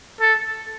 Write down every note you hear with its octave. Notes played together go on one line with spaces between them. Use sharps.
A4